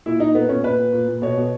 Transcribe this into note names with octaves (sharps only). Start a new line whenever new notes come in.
A#2 E4
A#2 D#4
A#2 B3
A#2 C#4
A#2 B4
A#2
A#2
A#2
B2 C#5
B2